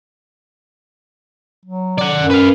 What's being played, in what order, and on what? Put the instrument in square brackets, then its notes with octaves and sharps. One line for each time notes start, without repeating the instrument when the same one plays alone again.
[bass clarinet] F#3
[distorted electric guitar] D5 F#5
[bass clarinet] F#2
[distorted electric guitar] B4 F5